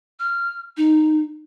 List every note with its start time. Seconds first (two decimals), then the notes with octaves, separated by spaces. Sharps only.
0.20 F6
0.77 D#4